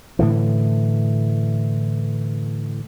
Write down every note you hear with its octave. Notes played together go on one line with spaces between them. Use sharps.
A2 D3 E3